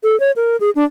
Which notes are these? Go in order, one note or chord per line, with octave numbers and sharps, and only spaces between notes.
A4
C#5
A#4
G#4
D4